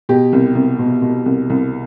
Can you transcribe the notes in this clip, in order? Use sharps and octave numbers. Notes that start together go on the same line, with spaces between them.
B2 G4
C2
C2
B2
B2
C2
C2